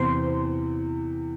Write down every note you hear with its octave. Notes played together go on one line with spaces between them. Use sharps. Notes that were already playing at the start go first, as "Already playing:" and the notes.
Already playing: E2 C3 E3 C5 C6